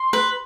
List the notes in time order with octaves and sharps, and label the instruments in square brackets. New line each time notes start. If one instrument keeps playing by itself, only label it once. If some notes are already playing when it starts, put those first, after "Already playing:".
Already playing: [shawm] C6
[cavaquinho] B4